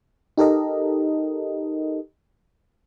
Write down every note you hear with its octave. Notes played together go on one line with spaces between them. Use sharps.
D#4 G4 A4 A#4 D#5